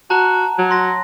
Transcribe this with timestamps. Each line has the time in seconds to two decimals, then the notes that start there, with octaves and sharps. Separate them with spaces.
0.10 F#4 A5 A#5 F#6
0.58 F#3
0.71 C6 A#6